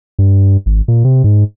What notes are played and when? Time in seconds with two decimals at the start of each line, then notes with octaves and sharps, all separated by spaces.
0.19 G2
0.66 G#1
0.88 A#2
1.05 C3
1.24 G#2